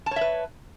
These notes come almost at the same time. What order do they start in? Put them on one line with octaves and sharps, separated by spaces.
A5 C#5 E5 B4